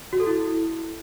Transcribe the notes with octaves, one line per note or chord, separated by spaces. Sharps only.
F#4
A4
E4